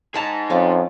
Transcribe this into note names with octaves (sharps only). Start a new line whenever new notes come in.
D#4 G#4 F#5 A5 A#5
F2 C#4 F4 D5